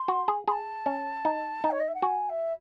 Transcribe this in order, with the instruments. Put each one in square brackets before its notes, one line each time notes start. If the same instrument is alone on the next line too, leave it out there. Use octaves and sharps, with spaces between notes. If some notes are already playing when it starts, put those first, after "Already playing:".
Already playing: [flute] C6
[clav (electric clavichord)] F#4
G#4
[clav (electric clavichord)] G#4 [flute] C6
[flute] A5
[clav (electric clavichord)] C#4
D#4
D#4
[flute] C#5
D#5
E5
F#5
[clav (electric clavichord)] F#4 [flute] G#5
[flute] E5